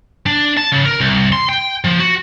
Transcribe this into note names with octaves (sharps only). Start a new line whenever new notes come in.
D4
A5
C#3
A#4
C2
C6
G5
F3
F#4